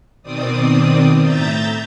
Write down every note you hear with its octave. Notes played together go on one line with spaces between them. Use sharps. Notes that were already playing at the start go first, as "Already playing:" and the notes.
B2 D#3 C4 D5 D#6
A2 E5 A#5 G6 A6